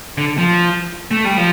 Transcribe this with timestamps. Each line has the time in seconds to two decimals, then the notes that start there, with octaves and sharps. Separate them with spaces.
0.18 D3
0.38 F3
1.11 A3
1.25 G3
1.37 F3